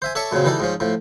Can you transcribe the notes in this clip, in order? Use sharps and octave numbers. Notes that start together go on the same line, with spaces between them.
C5 E5 G#5
A4 C#5 D5 E5 A5 C#6
F#2 A#2 C#3 F#3 C4
D#3 E3 G3 A4 D5
G#2 F3 C#4
A2 F3